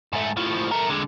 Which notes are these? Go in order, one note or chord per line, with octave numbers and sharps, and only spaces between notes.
G#2 A3
A2 F3
A3 A#4
D3 G#3